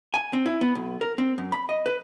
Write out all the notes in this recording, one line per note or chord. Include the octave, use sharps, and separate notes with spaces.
G#5
C4
E4
B3
B1
A#4
C4
F#2
B5
D#5
B4